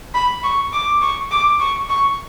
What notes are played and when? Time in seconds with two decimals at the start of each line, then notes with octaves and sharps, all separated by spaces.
0.14 B5
0.43 C#6
0.73 D6
1.02 C#6
1.31 D6
1.60 C#6
1.89 C#6